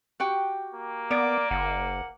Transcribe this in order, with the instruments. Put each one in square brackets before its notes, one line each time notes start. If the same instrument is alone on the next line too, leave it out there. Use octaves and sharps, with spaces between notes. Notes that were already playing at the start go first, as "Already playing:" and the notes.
[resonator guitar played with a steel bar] F#4 G4 G5
[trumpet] A#3
[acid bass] B3 [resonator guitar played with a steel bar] A#4 [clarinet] D5
[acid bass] F#1 [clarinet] F#5